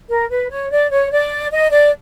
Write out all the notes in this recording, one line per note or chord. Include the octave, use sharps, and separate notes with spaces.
A#4
B4
C#5
D5
C#5
D5
D#5
D5